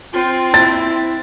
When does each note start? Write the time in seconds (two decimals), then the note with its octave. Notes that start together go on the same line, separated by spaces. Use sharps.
0.13 C4 F4
0.54 E4 A6